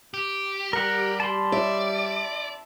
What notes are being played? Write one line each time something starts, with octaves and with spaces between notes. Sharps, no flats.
G4
G3 A#4 F#5
A5 B5 C6
D5 E5